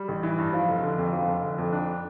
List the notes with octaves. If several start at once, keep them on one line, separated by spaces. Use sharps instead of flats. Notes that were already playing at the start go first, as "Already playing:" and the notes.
Already playing: G3
A1
E3
G2
F3
F1
D3
F2
F3
F1
D3
F2
D4